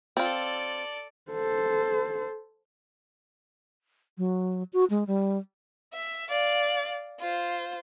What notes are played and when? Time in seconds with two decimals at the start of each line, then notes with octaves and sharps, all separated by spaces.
0.17 C4 F4 A4 D5
1.32 A4 C5
4.18 F#3
4.73 F#4
4.90 G#3
5.07 G3
5.94 E5
6.30 D5 F5
7.20 F4 C5